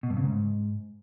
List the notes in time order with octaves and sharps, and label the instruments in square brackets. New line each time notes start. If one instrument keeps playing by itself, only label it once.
[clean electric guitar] B2
G2
C#3
G#2